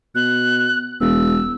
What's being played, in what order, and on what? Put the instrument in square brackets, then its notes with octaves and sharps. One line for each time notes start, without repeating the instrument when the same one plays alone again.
[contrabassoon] B2 [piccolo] F#6
[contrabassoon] E1 [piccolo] E6